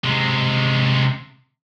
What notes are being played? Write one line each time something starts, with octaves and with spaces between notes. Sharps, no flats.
C3 G#3